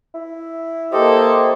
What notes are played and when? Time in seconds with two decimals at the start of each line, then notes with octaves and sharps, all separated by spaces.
0.14 E4
0.92 A#3 G4 A4 C5 D#5